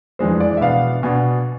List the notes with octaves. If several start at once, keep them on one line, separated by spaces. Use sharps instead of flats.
F2 E3 G#3 D4 C5
D5
E5
B2 B3 D4 F5
B2 B3 D4 G#5